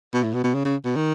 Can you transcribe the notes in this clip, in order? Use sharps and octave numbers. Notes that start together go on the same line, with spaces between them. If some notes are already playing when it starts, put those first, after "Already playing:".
B2
A2
B2
B2
C#3
C#3
B2
D#3